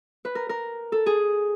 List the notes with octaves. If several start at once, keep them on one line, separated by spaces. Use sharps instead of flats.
B4
A#4
A#4
A4
G#4